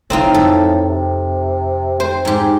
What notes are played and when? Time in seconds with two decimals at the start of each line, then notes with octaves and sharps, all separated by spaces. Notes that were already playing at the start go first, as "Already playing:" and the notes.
0.10 A2 D3 F#3 C4 D#4 F4
0.34 F2 A4
0.88 C3
2.00 C4 C5
2.25 G#2 G4